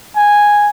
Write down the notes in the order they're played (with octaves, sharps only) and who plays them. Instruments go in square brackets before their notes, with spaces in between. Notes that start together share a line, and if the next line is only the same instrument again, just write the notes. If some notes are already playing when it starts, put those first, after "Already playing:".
[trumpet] G#5